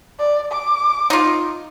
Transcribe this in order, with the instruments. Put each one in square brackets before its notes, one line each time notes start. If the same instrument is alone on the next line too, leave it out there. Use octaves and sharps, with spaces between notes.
[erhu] D5
D6
[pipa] D#4 F4